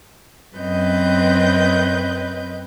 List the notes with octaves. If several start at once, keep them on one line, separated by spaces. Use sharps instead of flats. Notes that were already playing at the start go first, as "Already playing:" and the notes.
F#2 C4 B4 D#5 G6